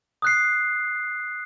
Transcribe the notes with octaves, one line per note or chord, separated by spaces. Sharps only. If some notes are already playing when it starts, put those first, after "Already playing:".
D#6 F#6 C7